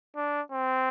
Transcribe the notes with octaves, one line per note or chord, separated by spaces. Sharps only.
D4
C4